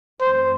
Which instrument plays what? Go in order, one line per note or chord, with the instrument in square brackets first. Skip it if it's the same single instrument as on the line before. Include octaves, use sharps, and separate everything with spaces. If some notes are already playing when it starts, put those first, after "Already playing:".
[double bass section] F#2 E3 A3 C4 [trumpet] C5